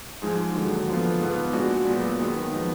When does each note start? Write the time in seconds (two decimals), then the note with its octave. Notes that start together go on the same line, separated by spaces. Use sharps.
0.22 G#2 F3 G#3 D#4 G#4
0.55 D#2 D3 F#3
0.88 D3 F3 B3 F4
1.21 G#2 F3 B3
1.53 A#2 G#3 D4 F#4
1.86 A#2 F#3 B3
2.19 F#2 D#3 G#3 B3
2.52 F3 B3 D#4